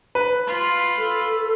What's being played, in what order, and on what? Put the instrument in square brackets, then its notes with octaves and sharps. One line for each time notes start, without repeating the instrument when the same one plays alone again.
[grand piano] B4
[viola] F4 B5
[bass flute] A4